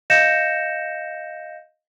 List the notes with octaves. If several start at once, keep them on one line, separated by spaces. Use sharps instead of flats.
D#5 F5 G6 A#6 C#7 E7